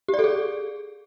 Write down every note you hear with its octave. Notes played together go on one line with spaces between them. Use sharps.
G4
D5
A4
G#4